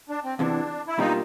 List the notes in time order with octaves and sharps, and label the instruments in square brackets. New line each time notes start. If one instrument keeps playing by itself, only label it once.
[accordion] D4
C4
[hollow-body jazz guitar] E2 C3 E3 [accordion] D4
[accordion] E4
[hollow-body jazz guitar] B2 G3 A#3 D4 F4 [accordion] D#4